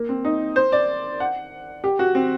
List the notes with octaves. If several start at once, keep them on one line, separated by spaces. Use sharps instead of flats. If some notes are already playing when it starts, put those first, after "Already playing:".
Already playing: A#3
C4
D#4
C5
D5
F#5
G4
F#4
C4